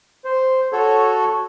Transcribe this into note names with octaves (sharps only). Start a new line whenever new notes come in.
C5
F#4 A4 C#5